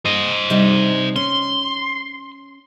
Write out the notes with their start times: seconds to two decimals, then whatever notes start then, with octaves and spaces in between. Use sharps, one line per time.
0.05 C5 D#5
0.50 C3 G3 D#4
1.16 C#4 C6